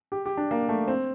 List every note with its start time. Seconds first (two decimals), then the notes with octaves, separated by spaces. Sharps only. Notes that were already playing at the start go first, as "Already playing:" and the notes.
0.12 G4
0.26 G4
0.37 D4
0.51 A#3
0.69 A3
0.88 C4